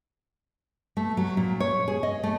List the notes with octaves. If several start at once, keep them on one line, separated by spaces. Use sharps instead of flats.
A3
F#3
A#2
C#5
G#4
D#5
A3